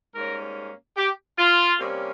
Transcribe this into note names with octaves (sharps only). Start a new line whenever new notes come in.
G#2 G3 A#3 C#4 A#4
G4
F4
C3 G3 A#3 C#4